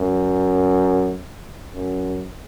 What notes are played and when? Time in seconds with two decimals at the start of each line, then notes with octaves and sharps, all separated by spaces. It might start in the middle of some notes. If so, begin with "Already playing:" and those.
Already playing: F#2
1.74 F#2